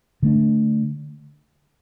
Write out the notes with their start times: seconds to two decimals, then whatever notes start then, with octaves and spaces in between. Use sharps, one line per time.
0.23 D3 A3 D4